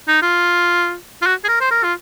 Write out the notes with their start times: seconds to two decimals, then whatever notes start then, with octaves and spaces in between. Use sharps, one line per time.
0.08 D#4
0.22 F4
1.22 F4
1.26 F#4
1.45 G#4
1.49 A#4
1.61 C5
1.71 A#4
1.84 F4